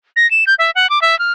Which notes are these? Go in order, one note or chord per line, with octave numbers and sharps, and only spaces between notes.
A#6
E7
G6
E5
F#5
D6
E5
F6